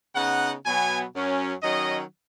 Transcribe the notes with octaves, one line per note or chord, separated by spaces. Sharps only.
C#3 B3 D#4 F#5
B2 F#3 B3 G#5
F#2 F#3 C#4
D#3 F#3 C#4 D#5